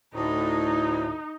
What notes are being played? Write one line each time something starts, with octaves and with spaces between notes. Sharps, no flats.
D2 A2 D#4